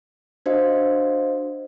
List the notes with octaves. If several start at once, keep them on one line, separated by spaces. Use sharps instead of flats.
D4 F#4 C5 D#5 F5